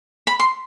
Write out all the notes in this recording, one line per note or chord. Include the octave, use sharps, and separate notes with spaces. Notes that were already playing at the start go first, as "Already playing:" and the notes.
B5
C6